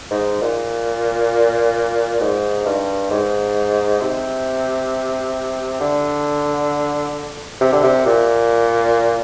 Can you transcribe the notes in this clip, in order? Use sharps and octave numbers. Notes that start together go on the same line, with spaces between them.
G#2
A#2
G#2
G2
G#2
C3
D3
C3
D3
C3
A#2